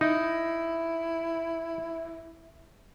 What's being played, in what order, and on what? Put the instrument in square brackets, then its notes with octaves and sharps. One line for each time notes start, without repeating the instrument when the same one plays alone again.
[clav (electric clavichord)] D#4 [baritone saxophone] E4